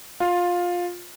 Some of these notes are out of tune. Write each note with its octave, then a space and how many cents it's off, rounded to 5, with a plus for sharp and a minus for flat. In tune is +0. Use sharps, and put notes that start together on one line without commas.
F4 +15